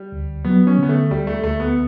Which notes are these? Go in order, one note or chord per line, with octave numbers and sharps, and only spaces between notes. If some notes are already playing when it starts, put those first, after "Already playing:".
Already playing: G3
D2
F#3 B3
C#4
D3 B3
A3
D2 G3
A3
D2 A3
B3